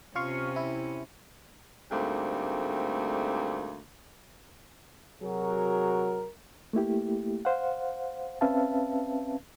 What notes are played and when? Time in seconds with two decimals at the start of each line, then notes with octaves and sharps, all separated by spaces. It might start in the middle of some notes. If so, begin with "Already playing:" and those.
0.15 C3 C#4 F4 F5 C#6
0.56 E4
1.91 D2 G#2 G3 A3 A#3 C4
5.22 C3 F#3 F#4 G#4 A#4
6.73 A3 A#3 E4 G4
7.45 C5 F5 F#5
8.41 C4 C#4 B4 E5 F5 A5